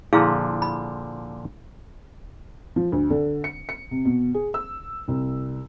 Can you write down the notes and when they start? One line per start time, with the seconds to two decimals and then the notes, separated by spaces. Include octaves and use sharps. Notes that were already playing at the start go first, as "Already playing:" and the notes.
0.13 A#2 D3 F3 E4 G#4 F5
0.62 B5
2.76 F3
2.92 D2
3.10 D3
3.44 C#7
3.69 C#7
3.91 C3
4.05 B2
4.34 G#4
4.54 E6
5.08 C2